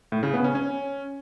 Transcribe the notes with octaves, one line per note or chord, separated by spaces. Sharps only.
A2
C#3
B3
C#4
C#4